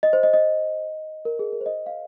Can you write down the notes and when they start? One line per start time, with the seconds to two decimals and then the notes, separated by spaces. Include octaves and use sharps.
0.03 D#5
0.13 C5
0.23 D#5
0.33 D#5
1.25 A#4
1.39 G#4
1.53 A#4
1.61 C5
1.66 D#5
1.86 F5